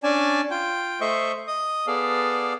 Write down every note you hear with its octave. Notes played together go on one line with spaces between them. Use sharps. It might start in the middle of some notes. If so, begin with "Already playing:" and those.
C#4 D4 D5 G#5 A5
F4 G5
A3 C5 D#5 E5 C#6
D#5 D#6
B3 G#4 A4 D5 F5